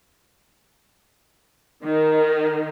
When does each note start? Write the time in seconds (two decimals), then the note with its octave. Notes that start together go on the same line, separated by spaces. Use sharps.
1.83 D#3